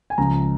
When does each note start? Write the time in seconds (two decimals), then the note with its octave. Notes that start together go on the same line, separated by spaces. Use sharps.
0.10 G#5
0.18 C#2 C#3 F3 G#3 A#5